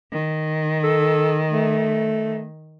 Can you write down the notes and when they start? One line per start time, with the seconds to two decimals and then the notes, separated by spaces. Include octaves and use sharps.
0.12 D#3
0.84 A4
1.50 A3